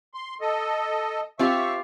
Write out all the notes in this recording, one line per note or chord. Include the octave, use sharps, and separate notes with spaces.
C6
A4 D#5
C4 F4 G4 E5 C#6